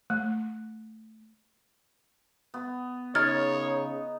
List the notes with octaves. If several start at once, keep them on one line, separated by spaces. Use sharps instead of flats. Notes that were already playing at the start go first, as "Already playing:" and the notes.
A3
B3
C#3 D#4 C#5 F6 G#6 A6